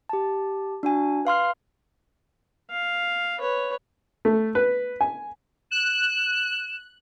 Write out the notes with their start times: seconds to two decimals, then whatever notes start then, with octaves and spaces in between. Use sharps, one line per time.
0.09 G4 A5
0.83 D4 F#4 G#5
1.25 B4 F5 C6 F6
2.70 F5
3.39 B4 C#5
4.25 A3
4.55 B4
5.01 G#5
5.71 F#6 E7